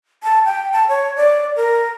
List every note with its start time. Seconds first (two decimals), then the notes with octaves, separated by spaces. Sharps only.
0.23 A5
0.45 G5
0.73 A5
0.89 C#5
1.16 D5
1.56 A#4